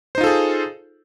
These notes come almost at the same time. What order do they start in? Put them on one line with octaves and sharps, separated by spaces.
C5 D#4 F4 A4 G#4